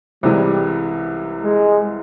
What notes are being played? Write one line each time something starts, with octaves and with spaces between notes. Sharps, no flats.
C2 C3 E3 G3 G#3
G#3